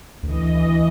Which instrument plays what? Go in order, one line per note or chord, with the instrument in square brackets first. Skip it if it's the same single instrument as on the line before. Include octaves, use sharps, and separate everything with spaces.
[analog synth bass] D2 [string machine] E3 D#5